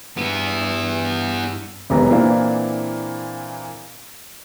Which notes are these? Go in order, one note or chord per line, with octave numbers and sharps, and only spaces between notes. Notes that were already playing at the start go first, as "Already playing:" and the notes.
G2 B3 E4
E1 B1 C3 B3 A#5
A#2 E3 A#3 C4 D4 E4